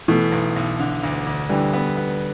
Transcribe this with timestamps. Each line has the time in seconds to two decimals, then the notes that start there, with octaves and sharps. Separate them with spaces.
0.08 B2 E3 A3
0.32 B1
0.56 B1
0.80 D3
1.03 D2
1.27 D2
1.50 D3 E3 G3
1.73 B3
1.97 B3